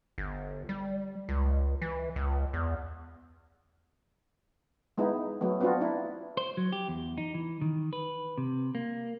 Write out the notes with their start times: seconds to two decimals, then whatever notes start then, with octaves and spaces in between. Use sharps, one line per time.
0.18 G1
0.69 G3
1.29 C#2
1.82 E3
2.16 C#2
2.53 E2
4.98 G#3 B3 D#4 E4
5.41 F#3 A3 B3
5.60 B3 C4 D4 F4 F#4
5.81 D4 E4
6.37 C5
6.57 F#3
6.72 G4
6.88 E2
7.18 D#4
7.34 E3
7.62 D#3
7.93 B4
8.38 C3
8.75 A#3